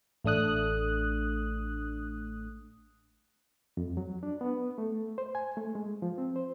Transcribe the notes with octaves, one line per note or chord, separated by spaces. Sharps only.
A1 A3 D4 D#6 F#6
F2
F#3
D4
B3
A3
C5
G#5
A3
G#3
F3
C4
C5